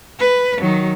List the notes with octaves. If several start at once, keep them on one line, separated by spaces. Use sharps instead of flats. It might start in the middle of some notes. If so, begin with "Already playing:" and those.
B4
D#3 F#3